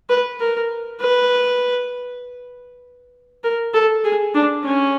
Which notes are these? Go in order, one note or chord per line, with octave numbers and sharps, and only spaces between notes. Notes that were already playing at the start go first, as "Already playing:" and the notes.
B4
A#4
B4
A#4
A4
G#4
D4
C#4